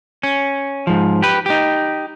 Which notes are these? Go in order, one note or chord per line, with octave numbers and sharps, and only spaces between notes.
C#4
G#2 F3
G4 B4
D#4 G4